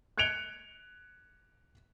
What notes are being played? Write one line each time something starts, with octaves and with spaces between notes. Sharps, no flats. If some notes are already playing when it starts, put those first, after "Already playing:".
F#6 G#6 C#7 D7 F7 G7